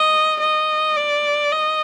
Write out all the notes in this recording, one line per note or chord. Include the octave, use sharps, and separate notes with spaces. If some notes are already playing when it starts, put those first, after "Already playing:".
Already playing: D#5
D#5
D5
D#5